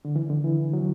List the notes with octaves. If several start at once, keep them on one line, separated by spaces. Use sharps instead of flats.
D3
E3
D3
E3
F#3